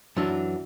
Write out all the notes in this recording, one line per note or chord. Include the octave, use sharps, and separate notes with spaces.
F#2 E3 D4